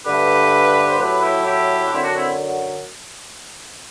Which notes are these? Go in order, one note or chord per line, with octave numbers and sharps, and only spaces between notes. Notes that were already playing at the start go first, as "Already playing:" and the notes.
G2 D3 A3 G4 B4
C5
A2 F#3 A3 G4 B4
E4 G4
E4 G4
D4
F#2 D3 F#3 C4 E4
D4 F#4
C4 E4